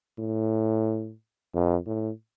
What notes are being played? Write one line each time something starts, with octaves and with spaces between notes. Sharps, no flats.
A2
F2
A2